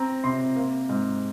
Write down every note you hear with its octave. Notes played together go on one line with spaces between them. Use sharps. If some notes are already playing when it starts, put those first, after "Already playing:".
Already playing: C4 A#5
C3 C6
A#3
G#2